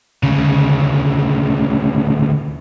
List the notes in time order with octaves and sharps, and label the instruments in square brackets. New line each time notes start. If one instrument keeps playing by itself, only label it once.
[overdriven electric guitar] D2 C#3